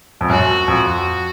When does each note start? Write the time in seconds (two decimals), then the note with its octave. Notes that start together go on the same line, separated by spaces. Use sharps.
0.21 F2
0.29 F#2 F#4
0.68 F2
0.87 F#4